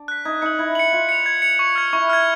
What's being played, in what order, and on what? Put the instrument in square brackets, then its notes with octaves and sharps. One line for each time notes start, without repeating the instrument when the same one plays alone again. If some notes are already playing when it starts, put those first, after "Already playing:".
Already playing: [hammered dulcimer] D4
[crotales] F#6 B6
[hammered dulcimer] D#4 [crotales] G#6
[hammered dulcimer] D#4 [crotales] C#7 F#7
[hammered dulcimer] E4 [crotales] G#6
[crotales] C#7 F#7
[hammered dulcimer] F4 [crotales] G#6
[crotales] C#7 F7
G#6
C#7 F7
C#6
F6 G#6
[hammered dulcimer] E4 [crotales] C#6
[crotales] F6 G#6